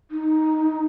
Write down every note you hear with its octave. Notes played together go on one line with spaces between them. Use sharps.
D#4